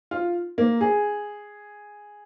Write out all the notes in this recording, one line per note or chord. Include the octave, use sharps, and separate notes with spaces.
F4
A#3
G#4